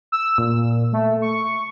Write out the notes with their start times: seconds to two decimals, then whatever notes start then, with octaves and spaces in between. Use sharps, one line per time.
0.12 E6
0.38 A#2
0.93 A3
1.22 C#6